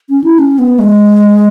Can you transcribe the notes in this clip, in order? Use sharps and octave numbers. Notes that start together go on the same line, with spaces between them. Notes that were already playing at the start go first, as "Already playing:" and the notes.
C#4
E4
C#4
B3
G#3